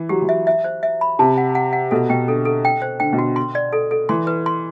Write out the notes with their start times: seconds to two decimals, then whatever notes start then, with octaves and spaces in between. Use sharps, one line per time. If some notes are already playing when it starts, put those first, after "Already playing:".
Already playing: E3
0.09 F#3 G4
0.22 E3
0.29 E5
0.47 E5
0.64 C5
0.83 E5
1.01 B5
1.19 C3 A5
1.38 F#5
1.55 F#5
1.73 F#5
1.91 B2 A4
2.10 B2 G5
2.28 D3 A4
2.45 A4
2.65 G5
2.82 C5
3.00 D3 G5
3.12 B2
3.18 F#4
3.36 C6
3.55 D5
3.73 A4
3.91 A4
4.09 E3 C6
4.27 B4
4.46 C6